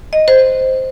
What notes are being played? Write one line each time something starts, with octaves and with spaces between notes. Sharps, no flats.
D#5
C5